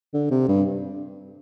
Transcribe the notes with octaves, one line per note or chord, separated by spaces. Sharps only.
D3
C3
G2